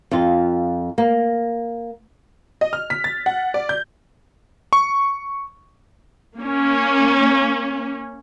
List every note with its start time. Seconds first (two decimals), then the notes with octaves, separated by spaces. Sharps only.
0.11 F2 F4
0.98 A#3
2.61 D#5
2.73 F6
2.90 B6
3.04 A6
3.26 F#5
3.54 D5
3.69 G6
4.73 C#6
6.36 A#3 C#4